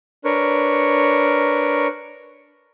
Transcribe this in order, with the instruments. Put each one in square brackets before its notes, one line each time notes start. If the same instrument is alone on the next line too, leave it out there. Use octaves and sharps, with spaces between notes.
[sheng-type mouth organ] D4 A#4 B4 C#5